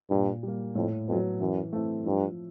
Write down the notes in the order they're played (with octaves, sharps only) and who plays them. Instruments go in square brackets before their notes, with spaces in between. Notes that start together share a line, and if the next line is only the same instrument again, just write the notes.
[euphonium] G2 [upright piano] A#2
[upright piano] G3 A#3
[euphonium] F2 [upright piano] A2
[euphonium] F2 [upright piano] F#3 B3
[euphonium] F#2 [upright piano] E3
[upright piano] A3 C4 E4
[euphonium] G2 [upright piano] F3